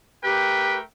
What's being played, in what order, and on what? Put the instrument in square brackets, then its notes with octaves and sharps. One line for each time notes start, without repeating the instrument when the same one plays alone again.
[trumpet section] A3 A#4 G5 [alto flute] G4 [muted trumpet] B4